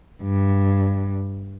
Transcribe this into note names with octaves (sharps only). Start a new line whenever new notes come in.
G2